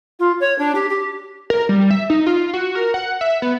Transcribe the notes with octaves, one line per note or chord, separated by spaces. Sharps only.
F4
C#5
D4
G4
G4
A#4
G3
E5
D#4
F4
F#4
A#4
F#5
E5
B3